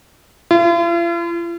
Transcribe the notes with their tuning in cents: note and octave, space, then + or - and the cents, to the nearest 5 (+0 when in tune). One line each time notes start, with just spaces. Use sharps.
F4 -45